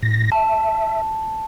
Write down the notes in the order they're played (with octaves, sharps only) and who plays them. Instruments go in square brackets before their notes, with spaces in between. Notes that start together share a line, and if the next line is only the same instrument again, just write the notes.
[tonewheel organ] A2 A#6
[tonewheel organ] E5 [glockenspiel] A5